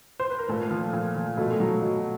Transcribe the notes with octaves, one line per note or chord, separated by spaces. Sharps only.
C5
B4
A#4
A#2 A3 A4
F3
A#2
F3
B2 A3 A4
F#3
B2